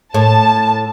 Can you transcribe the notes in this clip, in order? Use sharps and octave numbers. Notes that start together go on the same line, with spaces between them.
A2 A5